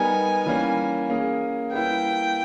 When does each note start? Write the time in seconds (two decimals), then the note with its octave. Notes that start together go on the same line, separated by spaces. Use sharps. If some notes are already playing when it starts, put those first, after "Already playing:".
Already playing: G3 B3 D#4 A#4 G#5
0.46 E3 G3 A#3 C#4
1.10 A#3 C#4 G#4
1.72 G3 A#3 E4 G4 B4 G5